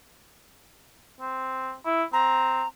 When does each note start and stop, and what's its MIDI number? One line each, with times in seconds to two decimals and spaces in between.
1.20 1.73 60
1.86 2.04 64
2.13 2.63 60
2.13 2.68 82